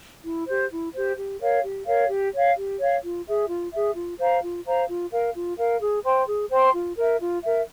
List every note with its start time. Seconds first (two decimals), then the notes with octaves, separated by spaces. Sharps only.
0.24 E4
0.47 G4 C5
0.71 E4
0.94 G4 C5
1.17 G4
1.40 A#4 C#5 F5
1.64 G4
1.87 A#4 C#5 F5
2.10 G4
2.33 C#5 F5
2.56 G4
2.79 C#5 F5
3.02 F4
3.26 G#4 E5
3.49 F4
3.72 G#4 E5
3.95 F4
4.19 C5 F5 A#5
4.42 F4
4.65 C5 F5 A#5
4.88 F4
5.11 A#4 F5
5.34 F4
5.58 A#4 F5
5.81 G#4
6.04 C5 G5 C6
6.27 G#4
6.50 C5 G5 C6
6.73 F4
6.97 A#4 E5
7.21 F4
7.43 A#4 E5